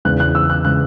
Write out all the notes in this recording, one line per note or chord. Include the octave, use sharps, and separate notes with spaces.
E2 C#3 G#3 B3 F#6
F#6
E6
F#6
C#3 G#3 B3 F#6